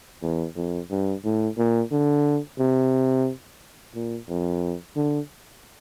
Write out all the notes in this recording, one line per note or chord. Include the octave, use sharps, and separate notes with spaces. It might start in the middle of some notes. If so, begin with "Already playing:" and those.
E2
F2
G2
A2
A#2
D3
C3
A#2
F2
D3